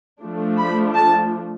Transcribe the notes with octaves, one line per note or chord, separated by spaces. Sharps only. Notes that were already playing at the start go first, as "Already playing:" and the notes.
F3 A3 D4
B5
A5